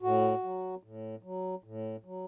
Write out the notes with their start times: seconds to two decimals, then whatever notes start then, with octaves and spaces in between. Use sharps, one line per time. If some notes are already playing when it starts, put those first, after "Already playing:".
0.02 A2 F#4
0.44 F#3
0.83 A2
1.23 F#3
1.64 A2
2.05 F#3